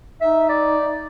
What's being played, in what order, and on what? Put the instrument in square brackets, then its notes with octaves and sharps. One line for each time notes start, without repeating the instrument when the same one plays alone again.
[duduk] D#4 [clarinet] E5
[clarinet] D5